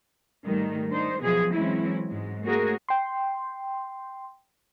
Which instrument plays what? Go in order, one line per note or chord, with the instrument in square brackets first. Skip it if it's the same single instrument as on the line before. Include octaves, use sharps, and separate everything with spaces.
[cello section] G#2 D#3 G3 A3
D4 D#4 C5
B2 F3 F#3 B3 G#4
E3 F#3 G#3 C4 C#4 E4
G#2 F#3 G#3
A3 A#3 C#4 F#4 G#4 A#4
[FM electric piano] G5 C6